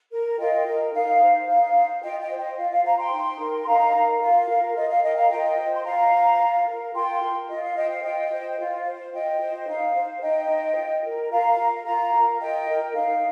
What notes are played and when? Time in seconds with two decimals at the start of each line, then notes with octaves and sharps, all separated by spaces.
0.11 A#4
0.38 F4 D#5 G5
0.66 A#4
0.93 D#4 F5
1.21 C5
1.47 D#4 F5
1.75 C5
2.03 F4 D#5 G5
2.21 D#5 G5
2.30 C5
2.39 D#5
2.57 F4 F5
2.70 F5
2.85 C5 F5 A#5
2.98 G5 C6
3.12 D#4
3.39 A#4
3.62 C6
3.66 D#4 F5 A#5
3.94 A#4
4.21 F4 F5
4.49 A#4
4.76 F4 D#5
4.89 F5
5.03 A#4 D#5 G5
5.17 F5 A#5
5.30 F4 D#5 G5
5.58 C5
5.75 C6
5.85 F4 F5 A#5
6.12 C5
6.40 F4
6.66 A#4
6.94 F4 G5 C6
7.21 A#4
7.49 F4 D#5
7.63 F5
7.76 C5 D#5 G5
7.90 F5
8.03 F4 D#5 G5
8.31 C5
8.58 F4
8.85 C5
9.13 F4 D#5 G5
9.40 C5
9.67 D#4 F5
9.94 C5
10.21 D#4 D#5 G5
10.49 C5
10.76 F4
11.04 A#4
11.31 F4 F5 A#5
11.58 A#4
11.85 F4 F5 A#5
12.13 A#4
12.40 F4 D#5 G5
12.67 A#4
12.94 D#4 F5